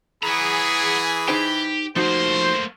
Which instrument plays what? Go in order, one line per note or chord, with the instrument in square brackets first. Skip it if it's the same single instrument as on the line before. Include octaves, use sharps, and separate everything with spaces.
[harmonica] E3 B5 [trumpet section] G#4 [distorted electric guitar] F#5 A#5
[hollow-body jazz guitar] D#4 C5 G5 [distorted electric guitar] G4
[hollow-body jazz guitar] F3 D#4 F#4 [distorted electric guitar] A3 A#3 [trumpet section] C5